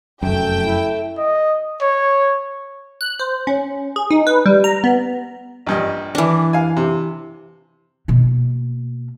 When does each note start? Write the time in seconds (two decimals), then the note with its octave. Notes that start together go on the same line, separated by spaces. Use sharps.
0.23 F1 F#2 A3 E5 G5
0.63 E4
1.18 D#5
1.82 C#5
3.01 F#6
3.19 C5
3.47 C#4
3.96 G#4
4.11 D#4
4.27 B4
4.46 G3
4.64 A#5
4.84 B3
5.67 A#1 G2 D#5
6.15 E3 D4
6.53 F5 G#5
6.77 C3
8.08 B2 A#3